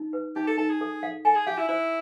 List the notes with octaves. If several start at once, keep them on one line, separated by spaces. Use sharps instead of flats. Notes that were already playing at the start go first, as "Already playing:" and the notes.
Already playing: D#4
B4
D#4 G4
A4
D#4 A4
G#4
A4
F5
A4 G#5
G#4
G4 F5
E4
E4 C5